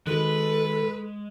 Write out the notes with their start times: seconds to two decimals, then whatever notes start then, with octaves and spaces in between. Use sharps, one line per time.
0.07 D#3 G#3 F#4 A4 B4